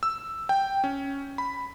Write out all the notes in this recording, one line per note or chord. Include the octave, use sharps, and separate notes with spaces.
E6
G5
C#4
B5